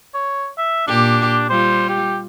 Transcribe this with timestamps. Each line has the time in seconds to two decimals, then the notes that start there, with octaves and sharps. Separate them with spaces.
0.14 C#5
0.58 E5
0.87 A#2 D4 G4
1.50 G3 F4 C5
1.89 G4